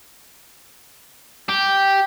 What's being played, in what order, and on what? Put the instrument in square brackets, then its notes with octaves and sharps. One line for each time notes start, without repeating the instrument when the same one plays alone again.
[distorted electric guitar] G4